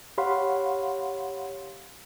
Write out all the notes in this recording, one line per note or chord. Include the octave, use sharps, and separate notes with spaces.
G4 C#5 F5 F#5 B5 C6